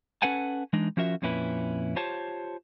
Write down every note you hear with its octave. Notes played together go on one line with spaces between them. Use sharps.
C#4 A4 B4 F#5 G#5 A5
E3 G#3 D4 D#4
F3 C#4 F4 F#4 A#4 E5
F2 A#2 C#4 E4 B4
F4 G4 C5 C#5 A5